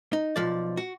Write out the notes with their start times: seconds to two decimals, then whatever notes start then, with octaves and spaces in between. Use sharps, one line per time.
0.13 D#4
0.36 B1 F3 D5
0.77 F#4